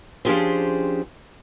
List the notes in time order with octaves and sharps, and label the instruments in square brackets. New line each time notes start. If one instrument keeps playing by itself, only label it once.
[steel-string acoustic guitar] F3 C#4 D4 G4 G#4 C5